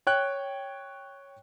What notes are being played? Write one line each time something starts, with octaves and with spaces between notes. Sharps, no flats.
C#5 G5 F#6